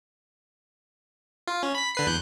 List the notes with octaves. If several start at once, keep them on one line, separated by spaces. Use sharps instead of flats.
F4
C#4
B5 B6
D3 B4 C7
E2 F#6 G6